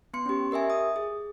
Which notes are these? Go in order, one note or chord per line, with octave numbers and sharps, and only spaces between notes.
B3 C6 C#7
C#4 G4
G4 A#4 D#5 E5 G#5
D#6
G#4